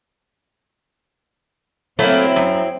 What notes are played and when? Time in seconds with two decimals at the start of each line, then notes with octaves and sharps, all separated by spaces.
1.99 F#3 A3 A#3 C4 E4
2.36 F#2